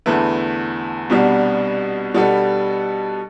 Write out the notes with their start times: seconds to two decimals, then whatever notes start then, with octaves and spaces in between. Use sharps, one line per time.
0.06 E2 D3 A3 E4 B4
1.10 C2 B2 G3 B3 D4
2.14 B2 G3 B3 D4 A4